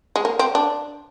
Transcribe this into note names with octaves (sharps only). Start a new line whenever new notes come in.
G#3
A#3
C4
D4